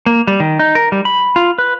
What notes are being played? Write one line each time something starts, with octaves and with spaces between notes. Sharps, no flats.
A#3
G3
D#3
D#4
A#4
G3
B5
F4
B4